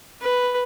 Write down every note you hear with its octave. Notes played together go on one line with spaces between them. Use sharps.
B4